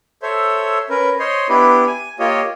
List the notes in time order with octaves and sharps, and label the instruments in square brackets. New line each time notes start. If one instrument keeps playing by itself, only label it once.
[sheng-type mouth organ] A4 C5 C#5 E5
C#4 A#4 B4
C5 C#5 D#5 C6
B3 D4 E4 G4 B4
G#5
A#3 F4 G4 C#5 D#5